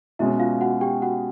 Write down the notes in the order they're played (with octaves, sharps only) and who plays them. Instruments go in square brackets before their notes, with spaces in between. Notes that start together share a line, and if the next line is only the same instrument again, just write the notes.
[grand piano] B2 G#3 C#4 [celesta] E4 E5
[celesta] F4 F5
F#4 F#5
G4 G5
F#4 F#5